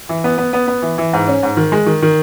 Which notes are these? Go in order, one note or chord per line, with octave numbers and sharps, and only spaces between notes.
E3
B3
B3
B3
B3
E3
E3
G#2
C#4
G#2
D#3
G#3
D#3
D#3